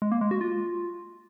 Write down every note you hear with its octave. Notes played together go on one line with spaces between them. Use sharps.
G#3
A#3
G#3
F#4
F4